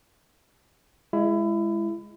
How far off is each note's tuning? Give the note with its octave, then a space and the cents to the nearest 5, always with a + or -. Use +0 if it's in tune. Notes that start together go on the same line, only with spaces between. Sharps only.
G#3 -5 E4 +25